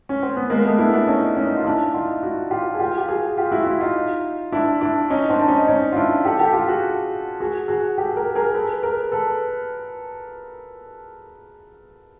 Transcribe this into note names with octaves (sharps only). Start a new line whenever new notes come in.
C#4
C4
B3
G#3 A#3
A3 B3
D4 E4
D4 E4
C#4 D#4
C#4 D#4
F4
D4 E4
D#4 F4
E4 F#4
F4 G4
G#4
F4 G4
G4
F#4 G#4
F4 G4
E4 F#4
F4
E4 F#4
D#4 F4
D4 E4
D4 E4
C#4 D#4
C4 D4
D4
C#4 D#4
C#4 D#4
F4
D4 E4
G4 A4
G4 A4
F4 G4
F#4 G#4
F#4 G#4
F#4 G#4
G4 A4
G#4 A#4
G#4 A#4
A4 B4
G#4 A#4
A4 B4